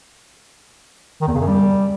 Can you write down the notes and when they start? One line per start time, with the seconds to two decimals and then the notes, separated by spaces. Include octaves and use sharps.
1.21 D#3
1.28 E2
1.34 C#3
1.41 F#2
1.47 G3